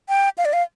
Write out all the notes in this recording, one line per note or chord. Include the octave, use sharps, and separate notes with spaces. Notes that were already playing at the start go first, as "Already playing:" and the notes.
G5
F5
D5
F5